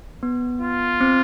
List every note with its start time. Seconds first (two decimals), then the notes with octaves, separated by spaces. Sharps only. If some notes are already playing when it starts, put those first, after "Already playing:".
0.23 B3
0.62 F4
1.01 C4